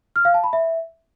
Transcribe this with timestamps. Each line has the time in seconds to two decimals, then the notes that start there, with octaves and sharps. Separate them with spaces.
0.16 F6
0.25 F5
0.34 A5
0.44 B5
0.53 E5